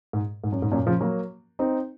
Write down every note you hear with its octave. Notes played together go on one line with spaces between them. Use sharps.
G#2
G#2
F#2
G#2
F#2 A#2
C#3 F3
F#3 A#3
C4 D#4